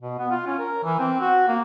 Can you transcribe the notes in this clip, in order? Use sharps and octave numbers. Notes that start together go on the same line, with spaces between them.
B2
B3
F4
C#4
A#4
E3
C4
F#4
A#3